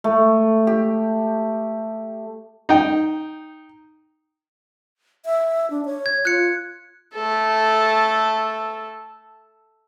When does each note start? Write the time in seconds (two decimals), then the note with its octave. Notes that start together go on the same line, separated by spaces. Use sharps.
0.04 A3
0.67 G4
2.69 D#4 G5
5.25 E5
5.70 D4
5.85 C#5
6.06 G#6
6.25 F4 F#6 C#7
7.15 A3 A4